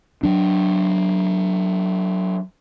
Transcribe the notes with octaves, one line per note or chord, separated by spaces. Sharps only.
F#3 D4